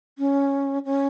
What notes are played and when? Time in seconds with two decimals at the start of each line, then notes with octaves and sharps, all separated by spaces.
0.19 C#4
0.85 C#4